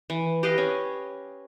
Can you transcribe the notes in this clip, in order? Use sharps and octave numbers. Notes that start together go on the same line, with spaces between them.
E3
G4 B4 D#5 F5
C#4